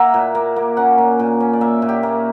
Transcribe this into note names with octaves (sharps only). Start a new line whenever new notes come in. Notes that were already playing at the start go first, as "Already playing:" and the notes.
Already playing: A#3 E5 F#5 A#5
A#2
A#3
A#3
C#4 F#5
A#2
A#2
C#4
D5
A#3 E5
A#2
G4
A#3